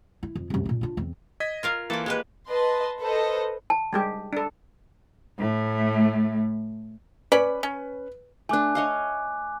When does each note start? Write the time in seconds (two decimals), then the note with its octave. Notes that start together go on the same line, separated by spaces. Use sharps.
0.23 E4
0.35 F2
0.50 C2 F#2
0.66 A#2 A3
0.81 D4 F4
0.97 E2 C4
1.40 D#5 G#6 B6
1.63 F4 A#4 F5
1.90 E3 A#3 F4 A4 D5
2.06 G#3 A#3 G4 B4
2.48 B4 D#5 A5 C6
3.00 A4 B4 C5 D#5
3.70 A5
3.93 G3 G#3 G4
4.33 D4 A4
5.39 A2 A3
7.32 C#4 B4 D5 B5
7.63 C#4
8.49 A3 D4 G#5 D6 F#6
8.75 C#5 D#5 F5